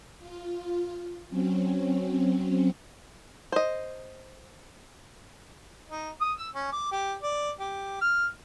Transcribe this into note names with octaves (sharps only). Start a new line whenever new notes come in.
F4
F#3 C4 C#4
C5 D#5
D#4
D#6
E6
C#4
D6
G4
D5
G4
F6